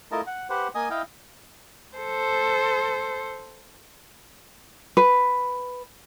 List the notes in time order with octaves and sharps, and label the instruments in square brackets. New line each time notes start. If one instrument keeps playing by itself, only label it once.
[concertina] A3 E4 F4 A#4 D#5 A5
F#5
G4 B4 C5 F#5
A#3 D#5 G#5 D#6
E4 D#5 F5 G5
[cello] A4 C5
[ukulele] B4